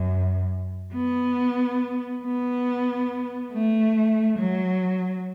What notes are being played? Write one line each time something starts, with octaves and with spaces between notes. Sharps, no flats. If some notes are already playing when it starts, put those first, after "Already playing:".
Already playing: F#2
B3
B3
A3
F#3